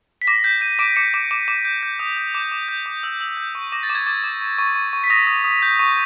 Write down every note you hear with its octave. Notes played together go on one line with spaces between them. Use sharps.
B6
D6 A#6
G6 B6
G6 D#7
D6 D7
D6 C#7
D6
D6
D6
G6
G6
D#6
D#6
D6 G6
D6
G6
D6
E6
E6
G6
C#6
D6 A#6
A6
D6
G#6
D6 A6
D6
C#6
C#6
C#6
C#6
B6
D#6 A#6
D#6
D#6
G6
C#6